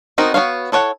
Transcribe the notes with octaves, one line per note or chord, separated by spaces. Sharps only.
B3 C4 D#4 F#4 A#4
B3 F#4 C#5 F5
E4 A4 C#5 F#5